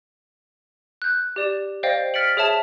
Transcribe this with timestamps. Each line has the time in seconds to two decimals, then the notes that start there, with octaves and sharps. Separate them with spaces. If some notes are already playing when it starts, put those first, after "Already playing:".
1.02 F#6 G6
1.36 G4 D5 E7
1.83 C5 D5 D#5 F5 G5
2.14 F6 A6 B6 C#7 D7 F#7
2.37 G#4 C#5 E5 A5 E7